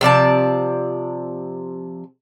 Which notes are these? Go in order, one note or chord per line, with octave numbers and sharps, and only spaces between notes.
C3 F3 D5 A5